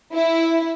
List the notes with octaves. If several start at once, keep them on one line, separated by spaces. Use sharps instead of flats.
E4